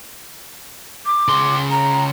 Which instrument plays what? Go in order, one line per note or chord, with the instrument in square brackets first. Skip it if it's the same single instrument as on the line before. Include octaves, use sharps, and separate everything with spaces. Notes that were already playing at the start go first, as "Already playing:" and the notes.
[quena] D6
[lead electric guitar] C#3 C6
[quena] A#5